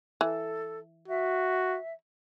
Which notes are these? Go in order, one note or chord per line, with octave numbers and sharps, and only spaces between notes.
E3 A4
F#4 E5